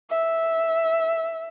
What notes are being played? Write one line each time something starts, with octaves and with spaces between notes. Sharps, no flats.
E5